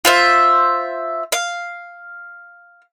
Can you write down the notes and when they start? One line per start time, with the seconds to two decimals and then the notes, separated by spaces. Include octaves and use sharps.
0.05 F4 C5 E5
1.32 F5